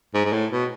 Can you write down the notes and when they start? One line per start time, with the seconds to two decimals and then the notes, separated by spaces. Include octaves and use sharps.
0.14 G#2
0.24 G#2
0.32 A2
0.51 B2